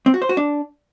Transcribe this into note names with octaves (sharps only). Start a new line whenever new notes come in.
C4
F#4
C5
F#4
D4